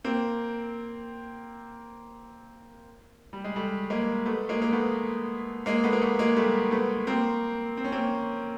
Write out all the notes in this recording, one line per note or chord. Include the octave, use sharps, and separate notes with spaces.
A#3 C4
G3
G#3
G3 A3
G#3 A#3
A3 B3
G#3 A#3
A#3
A3 B3
G#3 A#3
A3 B3
A#3
A3 B3
G#3 A#3
G3 A3
A3 B3
A#3 C4
C4
C#4
A#3 C4